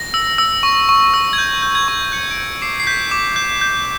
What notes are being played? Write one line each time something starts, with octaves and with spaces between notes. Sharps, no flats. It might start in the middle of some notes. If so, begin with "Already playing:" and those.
Already playing: A#6
E6
E6
C#6
C#6
E6
G#6
G6
G6
G#6
C#6
G6 C#7
D7
G6 C#7
D6 C7
C7
G6 B6
D6
G6
G6